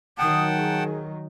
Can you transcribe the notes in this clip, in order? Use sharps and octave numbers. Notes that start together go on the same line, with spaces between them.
D#3 F#3 F#5 G5 A5 D#6
G#4